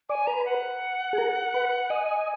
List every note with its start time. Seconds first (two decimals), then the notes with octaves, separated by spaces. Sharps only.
0.09 D5 G#5
0.27 B4 A#5
0.46 F#5
1.13 G#4
1.18 A#4
1.54 B4
1.90 D#5 G#5